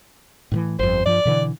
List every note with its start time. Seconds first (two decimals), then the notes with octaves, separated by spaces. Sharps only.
0.52 A2 D#3 E3
0.79 G1 F2 C5
1.06 G2 F3 D5
1.25 B2 D3 E3